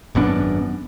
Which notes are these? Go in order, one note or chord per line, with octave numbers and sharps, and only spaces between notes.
G#1 F#2 B3 D4